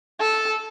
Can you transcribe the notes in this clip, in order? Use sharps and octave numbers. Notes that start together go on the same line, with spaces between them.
A4